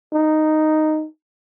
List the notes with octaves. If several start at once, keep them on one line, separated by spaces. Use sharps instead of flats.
D#4